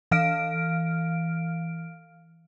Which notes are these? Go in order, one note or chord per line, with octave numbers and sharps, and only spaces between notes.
E3 F5 F6 D7